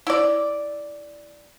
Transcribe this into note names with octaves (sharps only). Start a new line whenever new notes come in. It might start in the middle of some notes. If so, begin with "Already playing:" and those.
E4 D5